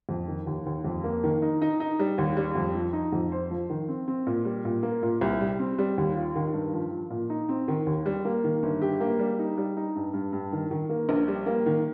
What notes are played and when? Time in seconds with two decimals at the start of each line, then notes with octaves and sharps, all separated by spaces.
0.09 F2
0.28 D#3
0.47 D#2
0.66 D#2
0.84 F2
1.04 A#3
1.24 D#3
1.42 D#4
1.62 D#4
1.80 D#4
1.99 G3
2.18 D#2
2.37 G3
2.55 F2
2.74 F3
2.93 D#4
3.13 F2
3.32 C5
3.51 F3
3.70 D#3
3.89 C4
4.08 C4
4.27 A#2
4.45 G3
4.65 A#2
4.83 A#3
5.03 A#2
5.21 C2
5.41 G3
5.59 C4
5.79 G3
5.98 D#2
6.15 F4
6.35 D#3
6.53 G2
6.73 F3
6.92 F3
7.10 A#2
7.30 D#4
7.49 C4
7.68 D#3
7.86 D#2
8.06 G3
8.25 A#3
8.44 D#3
8.63 G1
8.82 G4
9.00 A#3
9.19 G3
9.39 D#4
9.58 G3
9.77 D#4
9.95 G2
10.13 G2
10.33 G2
10.52 D#3
10.71 D#3
10.89 A#3
11.09 A#1
11.28 G3
11.46 A#3
11.66 D#3